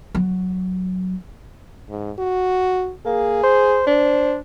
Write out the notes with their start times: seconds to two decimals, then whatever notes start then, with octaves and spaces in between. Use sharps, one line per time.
0.15 F#3
1.90 G#2
2.19 F#4
3.06 A#3 G#4
3.43 C5
3.87 D4 C5